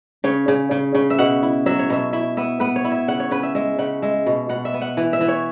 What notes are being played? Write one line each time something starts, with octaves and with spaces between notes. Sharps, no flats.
C#3 C#5
C#3
C#3
C#3
E5
B2 F#5
E4
F#3 E5
C#5
B2 E5
E4 E5
B3 E5
B3 B4
C#5
E4
E5
C#3 F#5
C#5
C#3 B4
E5
G#3 E5
C#3 F#5
G#3 E5
B2
B2 F#5
E5
B3
F#5
E3
E5
E3
C#5